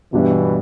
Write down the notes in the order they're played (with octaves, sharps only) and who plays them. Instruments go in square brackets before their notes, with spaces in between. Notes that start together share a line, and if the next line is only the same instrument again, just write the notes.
[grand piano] G1 G2 G3 D4 [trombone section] B2 E3